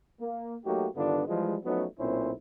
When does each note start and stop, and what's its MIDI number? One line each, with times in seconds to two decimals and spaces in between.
0.21 0.56 58
0.66 0.87 54
0.66 0.87 57
0.66 0.87 58
0.66 0.87 63
0.66 0.87 66
0.66 0.87 67
0.96 1.23 43
0.96 1.23 50
0.96 1.23 51
0.96 1.23 59
0.96 1.23 62
0.96 1.23 65
1.27 1.57 52
1.27 1.57 53
1.27 1.57 55
1.27 1.57 56
1.65 1.86 53
1.65 1.86 54
1.65 1.86 57
1.65 1.86 59
1.65 1.86 61
1.65 1.86 63
1.98 2.32 35
1.98 2.32 46
1.98 2.32 60
1.98 2.32 61
1.98 2.32 64
1.98 2.32 72